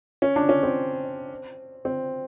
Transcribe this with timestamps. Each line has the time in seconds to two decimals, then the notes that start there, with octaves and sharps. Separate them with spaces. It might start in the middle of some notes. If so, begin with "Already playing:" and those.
0.22 C#4
0.36 D4
0.49 C#4
0.63 C4
1.85 C4